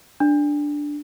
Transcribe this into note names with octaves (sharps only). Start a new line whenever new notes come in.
D4